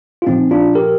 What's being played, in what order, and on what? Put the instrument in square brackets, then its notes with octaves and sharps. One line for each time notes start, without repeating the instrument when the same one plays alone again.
[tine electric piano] F4
A#2 F3 C4 D#4
D4 F4
G4 A#4